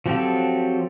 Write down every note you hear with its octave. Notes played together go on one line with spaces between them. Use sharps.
F3 F#3 C4 G4 A4